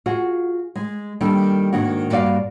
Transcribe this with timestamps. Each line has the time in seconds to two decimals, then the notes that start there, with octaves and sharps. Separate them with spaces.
0.06 F4 F#4 G#4
0.76 G#3
1.21 D#3 G3 A#3 D4 D#4 A4
1.73 G#2 D#3 A#3 D4 F#4
2.10 G2 A#3 F#4 D5 F5